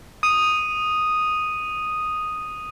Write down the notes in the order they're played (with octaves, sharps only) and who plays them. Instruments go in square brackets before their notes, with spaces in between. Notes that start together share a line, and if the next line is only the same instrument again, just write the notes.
[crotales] D#6 D#7